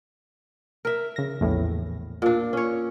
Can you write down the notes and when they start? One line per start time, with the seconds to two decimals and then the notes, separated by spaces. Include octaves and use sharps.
0.85 A#4 E5
1.16 C#3 A#6
1.40 A#1 E2 A2
2.22 A#2 D4
2.53 C#4 C#5